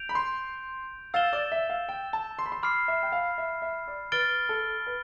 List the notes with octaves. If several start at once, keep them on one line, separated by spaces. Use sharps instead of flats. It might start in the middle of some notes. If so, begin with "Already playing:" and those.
Already playing: G6 D7 F7
B5
C6
F5 E6 A6 E7 G7
D5
E5
F5
G5
A5
C6
B5
C6
B5 D6 F6 C7
E5
G5
F5
E5
E5
D5
B4 F6 A6 D7 G7
A4
B4